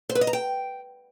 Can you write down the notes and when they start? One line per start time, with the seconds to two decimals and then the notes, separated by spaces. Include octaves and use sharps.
0.10 C5
0.15 B4
0.21 D#5
0.27 A#5
0.33 G5